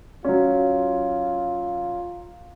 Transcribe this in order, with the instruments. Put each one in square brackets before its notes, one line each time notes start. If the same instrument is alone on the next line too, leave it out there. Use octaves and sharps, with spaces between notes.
[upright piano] F#3 C#4 [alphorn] F4